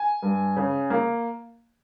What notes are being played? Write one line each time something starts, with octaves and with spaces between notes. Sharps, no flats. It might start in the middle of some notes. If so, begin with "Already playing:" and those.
Already playing: G#5
G2
C#3
A#3